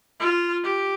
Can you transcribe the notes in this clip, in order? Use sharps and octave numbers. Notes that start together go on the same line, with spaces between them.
F4
G4